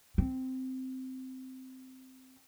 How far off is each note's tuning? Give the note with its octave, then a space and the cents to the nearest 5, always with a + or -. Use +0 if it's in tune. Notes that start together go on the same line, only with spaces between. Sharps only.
C4 -10